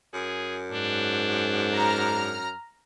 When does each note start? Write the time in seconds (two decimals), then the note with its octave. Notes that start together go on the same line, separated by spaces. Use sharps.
0.14 F#2 G#4
0.72 G#2 D4
1.74 A#5 F6